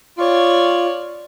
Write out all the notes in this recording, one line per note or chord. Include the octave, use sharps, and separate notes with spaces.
F4 C#5 D5